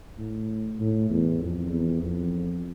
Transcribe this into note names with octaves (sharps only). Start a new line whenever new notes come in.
A2
A2
E2
F2
E2
F2